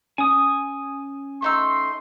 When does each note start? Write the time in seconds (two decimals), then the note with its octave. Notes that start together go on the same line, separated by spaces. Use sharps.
0.18 C#4 G#5 D#6
1.42 A3 D#4 C6 E6